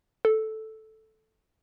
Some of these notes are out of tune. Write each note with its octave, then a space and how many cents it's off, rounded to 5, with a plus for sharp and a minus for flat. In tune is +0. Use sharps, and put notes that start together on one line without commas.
A4 -5